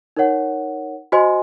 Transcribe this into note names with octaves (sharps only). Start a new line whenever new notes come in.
D#4 A#4 C#5 F#5
F#4 C5 D#5 G#5 C6